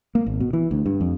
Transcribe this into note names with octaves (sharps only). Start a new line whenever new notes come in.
A#3
G#1
B2
E3
D2
G2
F2